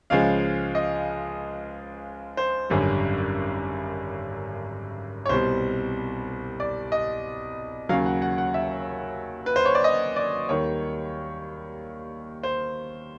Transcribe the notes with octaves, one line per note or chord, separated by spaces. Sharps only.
C#2 C#3 F3 G#3 F5
D#5
C5
G#1 F#2 D3 G3
C#5
C2 B2 G3 C5
D5
D#5
D#2 C#3 F#3 F5
F#5
F#5
F#5
E5
B4
C5
C#5
D5
D#5
D5
D#2 D#3 G3 C#5
C5